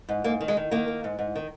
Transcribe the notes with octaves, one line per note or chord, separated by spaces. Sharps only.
G#2
G#2 A#3
D#3
G#3
D#3
D#3 A#3
D#3
G#2
G#2
D#3